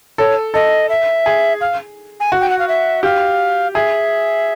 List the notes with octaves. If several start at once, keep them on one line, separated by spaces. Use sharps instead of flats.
A4 C#5
A4 D#5
E5
G#4
F5
G#5
F#4
G5
F#5
F5
E5
G4 F5
G#4 E5